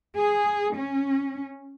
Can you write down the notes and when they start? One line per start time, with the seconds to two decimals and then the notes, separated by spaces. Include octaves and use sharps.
0.15 G#4
0.75 C#4